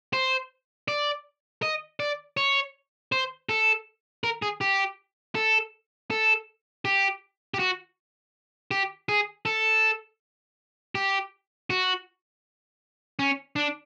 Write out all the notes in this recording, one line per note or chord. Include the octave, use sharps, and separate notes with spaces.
C5
D5
D#5
D5
C#5
C5
A4
A#4
G#4
G4
A4
A4
G4
G4
F#4
G4
G#4
A4
G4
F#4
C#4
D4